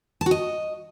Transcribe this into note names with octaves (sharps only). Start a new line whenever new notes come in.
A5
F#4
D#5